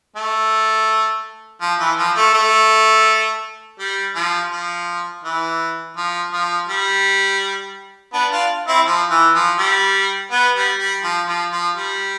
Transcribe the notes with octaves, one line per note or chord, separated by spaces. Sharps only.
A3
F3
E3
F3
A3
A3
G3
F3
F3
E3
F3
F3
G3
B3 D4
D4 F4
C4 E4
F3
E3
F3
G3
B3
G3
G3
F3
F3
F3
G3